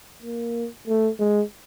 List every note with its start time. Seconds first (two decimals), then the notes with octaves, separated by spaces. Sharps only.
0.22 A#3
0.87 A3
1.19 G#3